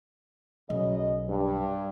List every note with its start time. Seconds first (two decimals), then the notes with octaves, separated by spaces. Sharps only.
0.70 B1 F#2 C#3 D#5
1.28 G2